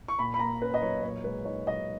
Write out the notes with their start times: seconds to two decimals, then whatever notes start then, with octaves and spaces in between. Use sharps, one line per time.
0.08 C#6
0.19 A#2 B5
0.34 B5
0.39 A#3 A#5
0.61 C#4 B4
0.74 D#5
0.82 B1 C#5
1.03 A#2 C#5
1.24 G#3 B4
1.45 D#4 C#5
1.67 B1 D#5